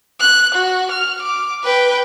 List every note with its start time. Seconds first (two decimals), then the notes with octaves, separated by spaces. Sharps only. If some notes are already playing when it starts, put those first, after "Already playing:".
0.21 F#6
0.55 F#4
0.91 F6
1.22 D6
1.64 B4 G5